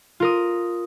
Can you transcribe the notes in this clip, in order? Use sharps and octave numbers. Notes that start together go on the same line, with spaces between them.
F4 A#4 D#6